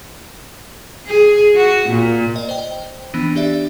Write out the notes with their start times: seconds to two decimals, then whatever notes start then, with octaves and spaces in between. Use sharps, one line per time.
1.06 G#4
1.56 F#4
1.90 A#2
2.36 D5 D#5
2.49 C5 G5
3.14 E3 B3 D4 D#4
3.35 D4 G4 D5 E5